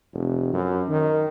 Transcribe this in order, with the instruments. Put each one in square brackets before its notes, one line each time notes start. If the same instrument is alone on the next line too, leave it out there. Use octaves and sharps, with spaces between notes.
[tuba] F1
F#2
D#3